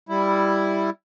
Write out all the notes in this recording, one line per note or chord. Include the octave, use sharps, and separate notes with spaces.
G3 E4